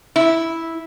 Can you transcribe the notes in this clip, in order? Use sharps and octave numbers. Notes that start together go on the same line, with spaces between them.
E4